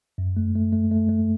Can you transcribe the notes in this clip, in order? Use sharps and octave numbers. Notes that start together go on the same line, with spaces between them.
F#2
A3
A3
A3
A3
A3